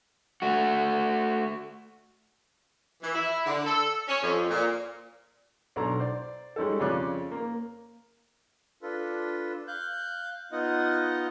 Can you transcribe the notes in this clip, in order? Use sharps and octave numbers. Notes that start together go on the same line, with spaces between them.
A3 F#4
E3
E4
D3
A4
C#4
F2
A#2
B1 D4 A4 A#5
C5 D5
G3 G#3 C#4 D#4 A4
F2 C#3 C#4 D5 D6 F#6
A#3
D4 F4 A4 B4
F5 F#6 G6
B3 D#4 F4 D#5 F#5